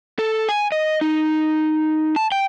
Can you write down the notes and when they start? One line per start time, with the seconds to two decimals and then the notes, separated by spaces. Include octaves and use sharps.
0.19 A4
0.49 G#5
0.72 D#5
1.01 D#4
2.16 A5
2.32 G5